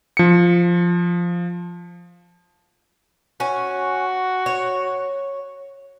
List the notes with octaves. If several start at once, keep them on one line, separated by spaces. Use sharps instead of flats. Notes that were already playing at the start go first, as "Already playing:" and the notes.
F3 C#7
C#4 F#4
C#5